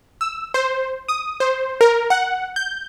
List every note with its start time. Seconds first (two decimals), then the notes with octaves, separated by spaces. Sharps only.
0.21 E6
0.54 C5
1.08 D#6
1.40 C5
1.81 A#4
2.10 F#5
2.56 G6